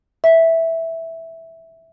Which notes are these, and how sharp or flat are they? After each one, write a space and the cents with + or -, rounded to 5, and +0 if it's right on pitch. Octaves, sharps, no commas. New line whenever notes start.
E5 -5